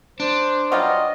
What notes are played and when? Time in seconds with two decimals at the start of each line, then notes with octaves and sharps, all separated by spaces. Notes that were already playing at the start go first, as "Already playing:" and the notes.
0.20 D4 C5
0.72 F#3 G3 F4 D#5